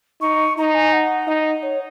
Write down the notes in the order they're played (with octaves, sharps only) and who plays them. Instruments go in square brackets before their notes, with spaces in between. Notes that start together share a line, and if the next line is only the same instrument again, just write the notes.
[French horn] D#4 [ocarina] C#6
[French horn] D#4 [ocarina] A#5
[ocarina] G#5
F#5
[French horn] D#4 [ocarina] D#5
[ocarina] C#5